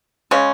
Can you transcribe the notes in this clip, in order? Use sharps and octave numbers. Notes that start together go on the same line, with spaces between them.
C#3 G#3 C#4